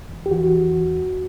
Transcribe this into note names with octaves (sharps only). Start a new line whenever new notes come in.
E2
G4
E3 F#4
E2
E2
E2